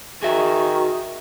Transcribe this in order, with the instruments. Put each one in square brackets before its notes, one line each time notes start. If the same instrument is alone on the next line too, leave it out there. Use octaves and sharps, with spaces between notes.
[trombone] D#3 [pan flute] F#4 [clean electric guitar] G#4 E5